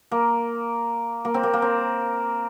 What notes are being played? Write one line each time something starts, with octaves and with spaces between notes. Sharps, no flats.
A#3
A#3
C4
A#3
A#3
C4